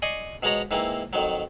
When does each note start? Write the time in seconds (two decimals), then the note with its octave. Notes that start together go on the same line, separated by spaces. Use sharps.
0.02 D5 D#5 G#5 C6 C#6
0.43 B2 F3 G#3 C#5 A#5 B5
0.71 G#2 E3 A#3 C4
1.13 F2 D#3 F3 F#3